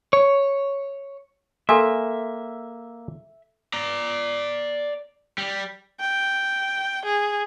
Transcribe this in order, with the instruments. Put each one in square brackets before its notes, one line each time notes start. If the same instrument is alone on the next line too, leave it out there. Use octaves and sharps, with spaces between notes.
[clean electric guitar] C#5
[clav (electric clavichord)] A#3 [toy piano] A4 G#5 C6 [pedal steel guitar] E5
[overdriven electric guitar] D5 A#5
G3
[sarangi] G5
G#4